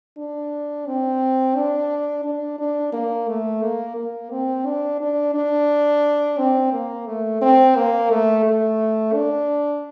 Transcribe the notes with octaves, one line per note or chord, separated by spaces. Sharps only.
D4
C4
D4
D4
D4
A#3
A3
A#3
A#3
C4
D4
D4
D4
C4
A#3
A3
C4
A#3
A3
A3
D4